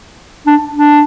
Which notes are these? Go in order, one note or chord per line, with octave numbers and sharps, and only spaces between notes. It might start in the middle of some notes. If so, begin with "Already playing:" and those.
D4
D4